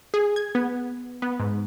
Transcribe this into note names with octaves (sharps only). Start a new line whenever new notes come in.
G#4
G#6
B3
B3
G#2